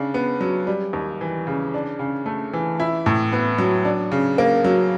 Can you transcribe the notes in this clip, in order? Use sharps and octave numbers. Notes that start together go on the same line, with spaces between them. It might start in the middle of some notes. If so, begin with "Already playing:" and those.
Already playing: C#3 D4
B3
F#3
G3
D#2
E3
C#3
D4
C#3
A3
E3
E4
A2
B3
F#3
D4
C#3
A#3
F#3